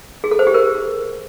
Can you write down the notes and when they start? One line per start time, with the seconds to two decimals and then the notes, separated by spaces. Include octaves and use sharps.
0.24 G#4
0.31 A4
0.39 C5
0.47 G4
0.54 A#4